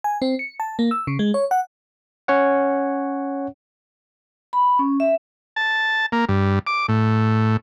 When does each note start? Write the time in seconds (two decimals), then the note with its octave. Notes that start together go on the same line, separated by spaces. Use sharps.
0.04 G#5
0.22 C4
0.39 C#7
0.60 A5
0.79 A#3
0.91 E6
1.07 C#3
1.19 G#3
1.34 C#5
1.51 F#5
2.28 C#4 C#5 F#5
4.53 B5
4.79 C#4
5.00 E5
5.56 A5
6.12 A#3
6.28 G2
6.67 D6
6.88 A2